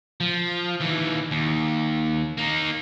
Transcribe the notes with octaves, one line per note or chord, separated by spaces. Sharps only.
F3
D#2 E3
D#2
A#3 D#4